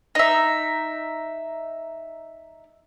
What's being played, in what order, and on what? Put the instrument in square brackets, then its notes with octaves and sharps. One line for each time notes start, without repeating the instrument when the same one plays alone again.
[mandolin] D#4 E5